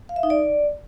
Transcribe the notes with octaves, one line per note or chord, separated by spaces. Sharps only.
F5
E5
D#4
D5